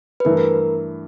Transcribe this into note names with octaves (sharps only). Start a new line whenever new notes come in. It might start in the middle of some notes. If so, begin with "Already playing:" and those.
B4
G2 E3 A3 A#4
A#4